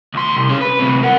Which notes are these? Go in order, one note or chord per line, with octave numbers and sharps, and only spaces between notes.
D2 C6
C2
C#4 G#4
B4
D2 C3
A#4 F#5